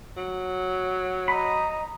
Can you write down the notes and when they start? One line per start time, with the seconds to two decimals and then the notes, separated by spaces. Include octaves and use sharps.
0.17 F#3
1.28 D#5 A#5 B5